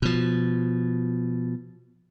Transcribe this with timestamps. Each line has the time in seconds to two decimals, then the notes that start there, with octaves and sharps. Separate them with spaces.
0.02 B2 F3